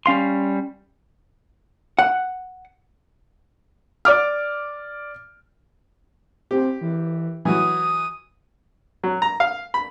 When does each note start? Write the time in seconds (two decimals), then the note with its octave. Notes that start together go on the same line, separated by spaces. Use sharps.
0.06 G3 C#4 F5 C6
1.99 F#5
4.05 D5 D6 F6
6.51 C4 G4
6.81 E3
7.45 E3 F#3 D#6
9.04 F#3
9.22 A#5
9.40 F5
9.74 B5